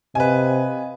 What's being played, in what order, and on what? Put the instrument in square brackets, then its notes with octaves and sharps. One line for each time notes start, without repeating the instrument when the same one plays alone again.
[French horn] C3 [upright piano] B4 G#5 [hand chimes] D#5 F5